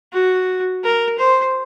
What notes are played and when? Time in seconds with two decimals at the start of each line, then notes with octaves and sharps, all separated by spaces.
0.13 F#4
0.84 A#4
1.18 C5